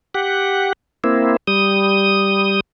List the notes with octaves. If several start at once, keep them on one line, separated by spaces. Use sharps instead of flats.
G4 F#5
A#3 C4 E4
G3 D#6